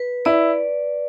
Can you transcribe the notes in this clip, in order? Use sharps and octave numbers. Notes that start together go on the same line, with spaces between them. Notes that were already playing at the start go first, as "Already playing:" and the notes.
Already playing: B4
E4 D5